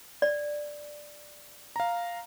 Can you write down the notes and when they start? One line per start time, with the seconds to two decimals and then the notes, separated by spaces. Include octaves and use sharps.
0.22 D5
1.76 F5 A#5